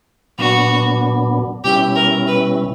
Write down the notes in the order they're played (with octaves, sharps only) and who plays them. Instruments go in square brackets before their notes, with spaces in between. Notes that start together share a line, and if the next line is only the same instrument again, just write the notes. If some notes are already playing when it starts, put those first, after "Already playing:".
[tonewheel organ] A#2 F#3 B3 D4 [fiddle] F#4
[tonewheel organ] B2 G3 C#4 E4 [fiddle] G4
[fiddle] A#4
B4